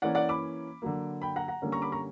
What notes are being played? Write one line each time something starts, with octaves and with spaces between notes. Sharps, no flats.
E3 A#3 C#4 D5 F#5
D5 F#5
B5 D6
D3 F#3 A#3
G5 B5
F#5 A#5
F#5 A#5
D3 G3 A#3 C#4
A#5 C#6
B5 D6
A#5 C#6